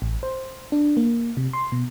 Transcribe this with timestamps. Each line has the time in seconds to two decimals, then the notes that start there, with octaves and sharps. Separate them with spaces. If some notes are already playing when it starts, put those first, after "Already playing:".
0.02 A1
0.23 C5
0.72 D4
0.97 A#3
1.37 C3
1.53 C6
1.72 B2